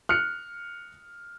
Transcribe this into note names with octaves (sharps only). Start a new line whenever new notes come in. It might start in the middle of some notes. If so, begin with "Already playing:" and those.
F6 F#6 C#7